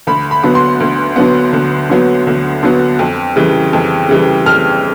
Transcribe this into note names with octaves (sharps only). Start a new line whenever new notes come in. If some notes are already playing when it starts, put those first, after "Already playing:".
D2 B5
B5
D3 F#3 B3
C6
D2
D3 F#3 B3
D2
D3 F#3 B3
D2
D3 F#3 B3
F2
C#3 E3 G3
F2
C#3 E3 G3
F2 F6